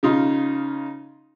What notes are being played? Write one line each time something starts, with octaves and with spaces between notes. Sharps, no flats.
C#3 D#4 F4